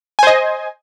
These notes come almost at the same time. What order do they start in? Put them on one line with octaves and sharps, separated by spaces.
G#5 C5 D#5